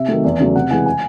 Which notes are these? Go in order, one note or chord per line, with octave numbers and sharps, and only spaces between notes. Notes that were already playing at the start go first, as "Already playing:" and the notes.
Already playing: C3 E5
D#3 F#3 A3
E2
C#3 F#3 A3
C3 F#5
E3 G#3 G#5
G#5